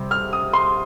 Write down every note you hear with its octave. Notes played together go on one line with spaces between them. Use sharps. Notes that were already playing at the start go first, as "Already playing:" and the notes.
Already playing: C3 G3 C4
F6
D#6
C6